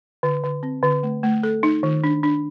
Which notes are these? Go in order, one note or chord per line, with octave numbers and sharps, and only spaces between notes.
D3
D3
C4
D3
A3
A3
A4
D#4
D#3
D4
D4